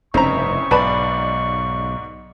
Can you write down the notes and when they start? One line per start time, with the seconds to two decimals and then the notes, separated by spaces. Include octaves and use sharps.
0.14 F1 G2 C#3 C4 D#4 E4 A#5 C#6
0.71 B1 G#2 B4 D5 A5 B5